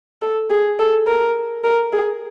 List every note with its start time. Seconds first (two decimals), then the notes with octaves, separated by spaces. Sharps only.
0.22 A4
0.50 G#4
0.79 A4
1.07 A#4
1.64 A#4
1.92 G#4